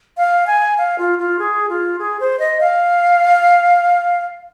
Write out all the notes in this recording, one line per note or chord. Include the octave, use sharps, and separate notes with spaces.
F5
G#5
F5
F4
F4
G#4
F4
G#4
C5
D#5
F5